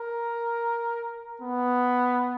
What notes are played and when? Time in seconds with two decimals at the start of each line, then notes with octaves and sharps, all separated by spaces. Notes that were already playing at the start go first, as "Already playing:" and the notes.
Already playing: A#4
1.42 B3